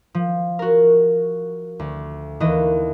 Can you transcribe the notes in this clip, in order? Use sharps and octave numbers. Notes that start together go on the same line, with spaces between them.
F3
F#4 A#4
D2
D#2 E3 D#5